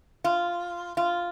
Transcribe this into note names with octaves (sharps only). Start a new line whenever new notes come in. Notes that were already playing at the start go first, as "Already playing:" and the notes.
F4
F4